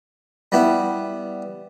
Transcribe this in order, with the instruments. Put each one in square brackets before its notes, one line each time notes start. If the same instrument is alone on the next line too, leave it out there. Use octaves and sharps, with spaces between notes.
[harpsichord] G3 B3 E4